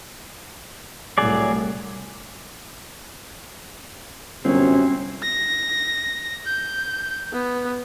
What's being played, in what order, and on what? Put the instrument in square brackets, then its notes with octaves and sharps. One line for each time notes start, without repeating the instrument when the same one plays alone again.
[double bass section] C2 A2 [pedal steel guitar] F#3 G#4 D5
[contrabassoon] G1 [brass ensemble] F#2 C3 [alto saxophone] C4 [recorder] C#4
[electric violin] A#6
G6
B3